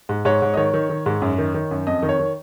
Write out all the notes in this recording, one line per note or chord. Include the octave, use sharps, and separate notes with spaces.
G#2
G#2 C#5
G#2
D#5
D#3 C#5
D#3
D#3
G#2
F#2
D#3
D#3
F#2
F2 D#5
D#3
C#5
D#3